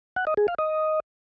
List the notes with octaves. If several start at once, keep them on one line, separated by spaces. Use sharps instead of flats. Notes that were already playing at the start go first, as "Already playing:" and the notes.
F#5
D#5
G#4
F5
D#5